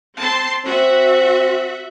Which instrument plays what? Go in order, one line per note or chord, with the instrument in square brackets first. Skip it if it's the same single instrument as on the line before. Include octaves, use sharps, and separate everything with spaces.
[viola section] C4 A5 C6
[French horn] C4 [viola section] F#4 E5